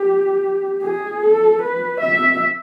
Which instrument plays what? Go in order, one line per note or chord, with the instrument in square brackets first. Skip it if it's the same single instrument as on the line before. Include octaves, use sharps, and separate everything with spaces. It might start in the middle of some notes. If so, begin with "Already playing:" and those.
Already playing: [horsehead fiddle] G4
G#4
A4
B4
E5